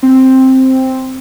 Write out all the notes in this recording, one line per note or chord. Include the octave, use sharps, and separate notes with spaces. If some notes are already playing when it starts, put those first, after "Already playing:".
C4